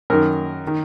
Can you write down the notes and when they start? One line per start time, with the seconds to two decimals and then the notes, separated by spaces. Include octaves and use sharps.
0.10 F#2 D#3 A#4
0.67 D#3